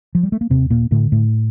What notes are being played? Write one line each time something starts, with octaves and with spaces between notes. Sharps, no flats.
F3
G3
A3
A#3
D#2 C3 C4
A#2 A#3
A2 D3 A3
A2 A3